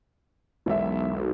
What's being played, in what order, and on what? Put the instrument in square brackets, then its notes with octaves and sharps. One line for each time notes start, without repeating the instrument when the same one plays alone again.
[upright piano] E1 E5 [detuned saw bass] B1